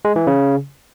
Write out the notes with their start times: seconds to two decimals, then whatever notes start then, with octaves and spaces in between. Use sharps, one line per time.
0.05 G#3
0.16 E3
0.27 C#3